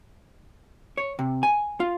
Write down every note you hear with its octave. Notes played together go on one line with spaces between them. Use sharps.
C#5
C3
G#5
F4